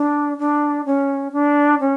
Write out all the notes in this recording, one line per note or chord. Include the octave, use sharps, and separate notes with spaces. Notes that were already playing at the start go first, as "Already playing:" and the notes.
Already playing: D4
D4
C#4
D4
C#4